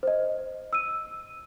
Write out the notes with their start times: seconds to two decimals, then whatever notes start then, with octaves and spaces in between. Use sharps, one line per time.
0.03 C5 D#5
0.73 E6 D#7